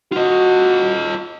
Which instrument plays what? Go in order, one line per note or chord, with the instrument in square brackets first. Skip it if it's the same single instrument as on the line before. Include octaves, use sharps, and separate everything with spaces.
[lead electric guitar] F4 D#5 [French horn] F#4